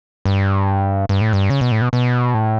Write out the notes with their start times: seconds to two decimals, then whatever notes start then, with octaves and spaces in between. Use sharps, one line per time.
0.25 G2
1.09 G2
1.21 A2
1.33 G2
1.50 C#3
1.61 B2
1.72 A2
1.81 B2
1.93 B2
2.34 A2